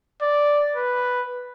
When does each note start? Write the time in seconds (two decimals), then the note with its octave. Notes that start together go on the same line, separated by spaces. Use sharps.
0.22 D5
0.76 B4